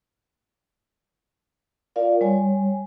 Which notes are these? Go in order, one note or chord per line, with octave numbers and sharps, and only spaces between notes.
F4 A#4 D5 F5
G3 C#5 G#5